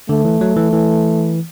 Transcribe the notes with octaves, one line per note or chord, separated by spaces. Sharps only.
D3 A3
E3
F#3
E3
E3